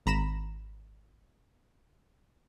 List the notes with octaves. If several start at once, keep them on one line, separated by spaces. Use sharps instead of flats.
G#1 A#5 B5 E7